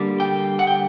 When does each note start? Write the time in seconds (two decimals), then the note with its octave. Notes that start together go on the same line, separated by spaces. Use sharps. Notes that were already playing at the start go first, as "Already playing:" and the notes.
Already playing: D3 G3 A#3
0.20 G5
0.59 F#5
0.67 G5